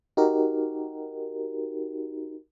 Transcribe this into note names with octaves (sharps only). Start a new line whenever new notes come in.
D#4 F#4 G4 A#4